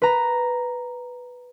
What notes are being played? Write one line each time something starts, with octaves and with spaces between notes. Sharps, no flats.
B4 A#5